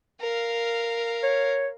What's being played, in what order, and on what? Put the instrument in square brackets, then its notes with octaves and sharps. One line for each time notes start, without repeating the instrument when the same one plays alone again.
[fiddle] A#4 F5
[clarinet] C#5